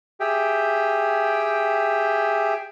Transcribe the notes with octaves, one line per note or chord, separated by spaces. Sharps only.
G4 G#4 E5 G5